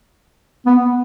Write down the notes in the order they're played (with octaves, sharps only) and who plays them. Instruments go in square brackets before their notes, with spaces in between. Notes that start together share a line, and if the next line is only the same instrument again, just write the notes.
[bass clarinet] B3